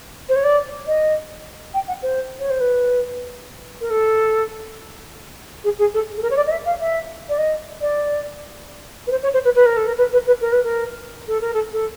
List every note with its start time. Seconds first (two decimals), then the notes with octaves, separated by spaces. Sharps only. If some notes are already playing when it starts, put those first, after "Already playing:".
0.29 C5
0.36 C#5
0.43 D5
0.87 D#5
1.74 G5
1.88 F#5
2.02 C5
2.39 C#5
2.50 C5
2.60 B4
3.81 A#4
3.90 A4
5.64 G#4
5.78 G#4
5.94 A4
6.17 A4
6.22 A#4
6.30 C#5
6.36 D5
6.46 D#5
6.51 E5
6.65 F5
6.80 E5
7.29 D5
7.38 D#5
7.81 D5
9.07 B4
9.11 C5
9.22 C#5
9.33 C5
9.44 B4
9.55 B4
9.65 A#4
9.76 A4
9.87 A#4
9.97 B4
10.12 B4
10.27 B4
10.41 A#4
10.52 B4
10.63 A#4
11.27 A4
11.41 A#4
11.53 A4
11.72 A4